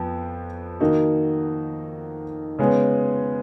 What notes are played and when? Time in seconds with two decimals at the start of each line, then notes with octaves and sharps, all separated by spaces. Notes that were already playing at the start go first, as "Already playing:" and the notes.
Already playing: F2 F3 B3
0.80 D#3 A#3 D#4 F#4
2.59 C#3 G#3 B3